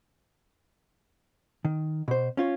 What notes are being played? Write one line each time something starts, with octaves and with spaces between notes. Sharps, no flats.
D#3
B2 C5
C#4 F4 C#5